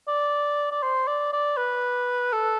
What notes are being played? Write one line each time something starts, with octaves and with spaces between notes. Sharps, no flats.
D5
D5
C5
D5
D5
B4
A4